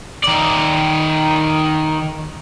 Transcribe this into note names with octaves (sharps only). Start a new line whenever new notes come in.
D#3 D5